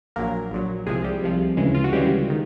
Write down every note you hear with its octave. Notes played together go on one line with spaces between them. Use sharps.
A#1 A#2 F#3 A#3 A#4
A#1 A#2 F#3
C2 C3 F3 G#3 G#4
G3 G4
C2 C3 F3
D2 C#3 E3 G#3
F4
F#4
D2 C#3 E3 G3 G#3 G4
D#3